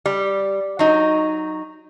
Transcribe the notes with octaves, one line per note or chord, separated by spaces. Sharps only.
G3
F#3 D#4